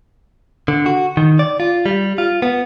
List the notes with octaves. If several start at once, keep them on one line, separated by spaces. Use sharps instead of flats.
D3
F#4
D#3
D5
F4
G3
F4
B3